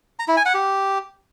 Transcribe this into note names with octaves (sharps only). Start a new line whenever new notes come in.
A#5
E4
G#5
F#5
G4